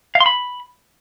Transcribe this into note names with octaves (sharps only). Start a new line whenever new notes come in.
F5
C6
B5